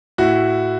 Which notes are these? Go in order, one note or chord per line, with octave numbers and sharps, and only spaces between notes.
A2 E4 F#4